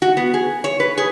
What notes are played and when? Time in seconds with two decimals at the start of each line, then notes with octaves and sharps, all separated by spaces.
0.02 F#4
0.17 B3
0.34 G#4
0.64 C#5
0.80 B4
0.98 G#4